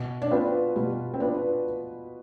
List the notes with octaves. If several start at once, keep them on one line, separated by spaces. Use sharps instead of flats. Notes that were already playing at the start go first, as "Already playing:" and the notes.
Already playing: B2
D4
B3 C4 F4 B4
B2 G3
C4
B3 D4 F4 B4